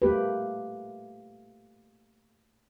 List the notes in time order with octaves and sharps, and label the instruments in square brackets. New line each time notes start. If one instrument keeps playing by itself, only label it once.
[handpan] A3 A#3 G4 B4